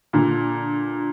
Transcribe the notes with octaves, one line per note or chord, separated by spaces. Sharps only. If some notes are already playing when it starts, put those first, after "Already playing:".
A#2 D3